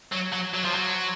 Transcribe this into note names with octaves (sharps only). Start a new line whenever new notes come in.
F#3
F#3
F#3
F3
F#3